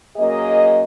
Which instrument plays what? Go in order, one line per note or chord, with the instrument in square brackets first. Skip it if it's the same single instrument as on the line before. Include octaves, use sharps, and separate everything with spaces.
[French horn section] F#2 A#3 G#4 D#5